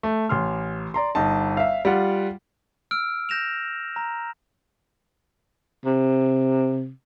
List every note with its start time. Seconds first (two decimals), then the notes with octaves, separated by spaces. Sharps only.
0.03 A3
0.29 A1 C6 F6
0.94 D5 A#5 C6
1.15 G1 D#4 A5
1.57 E5 F5
1.85 G3 F4 F#5
2.91 E6 F6 D7
3.29 G6 A#6 E7 F7
3.96 A#5
5.85 C3